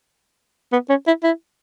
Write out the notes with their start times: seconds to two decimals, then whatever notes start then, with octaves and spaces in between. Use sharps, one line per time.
0.72 B3
0.89 C#4
1.07 E4
1.23 E4